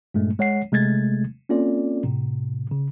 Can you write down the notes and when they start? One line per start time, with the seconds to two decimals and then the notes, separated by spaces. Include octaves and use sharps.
0.14 G2 A#2 G#3 A3
0.39 G#3 C#5 F#5 C7
0.72 C3 G#3 A3 G#6 A6
1.49 A#3 C4 C#4 F4 A4 D5
2.03 A2 C3
2.71 C#3